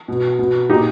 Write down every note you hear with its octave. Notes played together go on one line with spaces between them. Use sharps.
B2
B2
A#2 D#4 G4